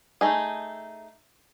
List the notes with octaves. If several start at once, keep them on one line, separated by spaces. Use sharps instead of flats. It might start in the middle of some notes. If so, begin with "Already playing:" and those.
A3 D#4 G#4